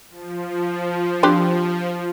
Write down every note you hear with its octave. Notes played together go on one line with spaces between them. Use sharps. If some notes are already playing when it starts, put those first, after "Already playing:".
F3
C4 D4 G4